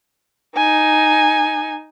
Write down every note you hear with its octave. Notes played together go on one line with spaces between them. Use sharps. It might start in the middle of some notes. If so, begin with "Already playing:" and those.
D#4 G#5